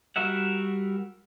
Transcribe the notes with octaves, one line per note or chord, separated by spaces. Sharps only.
G3 F#4 A#4 E5 F#5